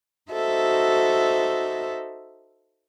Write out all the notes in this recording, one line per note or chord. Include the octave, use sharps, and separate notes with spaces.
D#4 F#4 A4 C5 E5